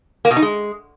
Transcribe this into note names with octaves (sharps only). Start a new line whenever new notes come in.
A#3
B2
D#4
G#3